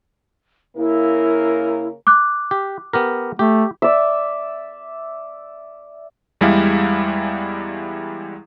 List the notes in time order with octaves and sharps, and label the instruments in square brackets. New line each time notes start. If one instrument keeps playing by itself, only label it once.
[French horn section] C#3 A#3 A#4 [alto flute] E4
[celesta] D6 F#6
[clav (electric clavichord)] G4
B3 G4 A#4
[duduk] A3 [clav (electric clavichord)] G4
[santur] D5 E5
[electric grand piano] E2 G3 G#3 E4 F5